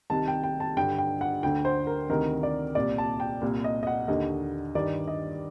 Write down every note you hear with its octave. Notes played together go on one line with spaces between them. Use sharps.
C2 C3 D#3 A5
G5
G5
A5
G2 D3 G5
G5
F#5
D2 D3 G5
C5
A#4
D2 C3 D#3 A#4
D5
C2 A#2 D5
A5
G5
C2 A#2
D#5
D#5
F#5
D#2 D3 D#5
G2 D#3 D5
D#5